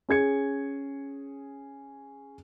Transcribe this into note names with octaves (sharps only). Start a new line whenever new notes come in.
C#4 G#4 G#6 C#7